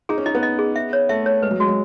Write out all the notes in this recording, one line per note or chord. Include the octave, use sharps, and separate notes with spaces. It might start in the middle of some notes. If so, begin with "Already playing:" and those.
D#4 G#4
C#4
D#4 D#5
B3
D#5
G#4
E5
C#5
A3 E5
C#5
G#3 B4
F#3
G#3 F#4
F#3